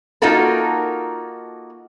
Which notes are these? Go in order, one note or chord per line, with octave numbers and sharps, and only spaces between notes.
A#3 D#4 F4 F#4 A4 A#4